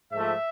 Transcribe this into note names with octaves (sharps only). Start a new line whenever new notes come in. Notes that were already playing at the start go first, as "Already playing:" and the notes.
G#2 F3 A3 E5